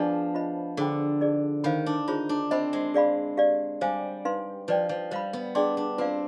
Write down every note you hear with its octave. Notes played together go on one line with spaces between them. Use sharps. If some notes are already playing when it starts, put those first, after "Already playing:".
Already playing: F3 B3 D4 G#4 D5 G#5 B5
F4 C5 D#5 B5
D3 G#4 C5 G5 B5
D#4 G#4 D5
D#3 C5 F5 B5
D4
D#4 F4 G#4 C5
D4
C4 C5 D#5 B5
G#3
G#4 D5 F5 B5
G4 D5 F5
G3 C5 F5 G#5
D#4 B4 F5 C6
F3 B4 D5 G5
F3
G3 C5 F5 B5
B3
D4 G#4 D5 G5 C6
D4
C4 F4 B4 D5 F5